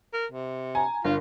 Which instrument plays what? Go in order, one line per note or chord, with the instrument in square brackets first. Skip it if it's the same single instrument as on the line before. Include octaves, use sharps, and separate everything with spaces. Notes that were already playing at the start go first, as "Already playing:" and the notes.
[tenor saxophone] A#4
C3
[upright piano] G#5 [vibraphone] A#5
[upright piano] G1 [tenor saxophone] F4 [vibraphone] A#4